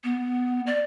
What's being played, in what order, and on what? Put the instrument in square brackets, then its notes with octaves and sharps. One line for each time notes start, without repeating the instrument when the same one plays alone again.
[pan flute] B3
D5